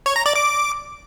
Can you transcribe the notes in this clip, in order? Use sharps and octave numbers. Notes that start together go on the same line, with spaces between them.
C#5
A#5
D5
D6